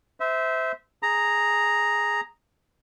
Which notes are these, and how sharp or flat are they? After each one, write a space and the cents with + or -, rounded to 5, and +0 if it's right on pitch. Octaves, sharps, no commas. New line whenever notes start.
C5 -25 E5 -20
G#4 +0 A#5 +0